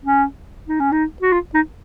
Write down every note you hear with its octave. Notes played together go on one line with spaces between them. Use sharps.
C#4
D#4
C#4
D#4
F#4
F4
D#4